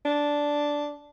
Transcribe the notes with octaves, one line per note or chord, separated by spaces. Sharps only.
D4